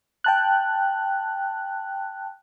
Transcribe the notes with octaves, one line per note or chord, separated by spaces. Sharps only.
G5 A5 F#6